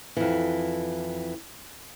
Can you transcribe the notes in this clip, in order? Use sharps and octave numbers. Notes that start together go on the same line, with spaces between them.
F2 E3